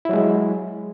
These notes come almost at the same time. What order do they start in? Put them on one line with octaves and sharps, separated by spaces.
E4 F#3 G#3